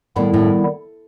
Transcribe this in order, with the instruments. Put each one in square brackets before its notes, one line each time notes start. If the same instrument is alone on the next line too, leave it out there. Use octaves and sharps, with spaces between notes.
[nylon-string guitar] A2 [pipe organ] D#3 G3 B3 E4
[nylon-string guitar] A2